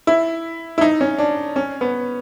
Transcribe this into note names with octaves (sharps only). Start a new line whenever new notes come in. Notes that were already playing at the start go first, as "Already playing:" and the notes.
E4
E4
D#4
C#4
D4
C#4
B3